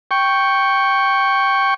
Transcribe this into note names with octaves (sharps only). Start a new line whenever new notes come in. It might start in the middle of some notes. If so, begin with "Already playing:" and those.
G5 C#6